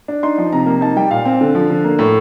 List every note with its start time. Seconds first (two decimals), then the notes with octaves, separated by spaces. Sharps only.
0.08 D4
0.23 D#4 C6
0.38 F3
0.52 C3 A#5
0.66 A#3
0.81 D#4 A5
0.96 G3 G5
1.10 A#2 F5
1.25 C4
1.41 D3
1.55 F3
1.70 D3
1.84 A#3
1.99 A2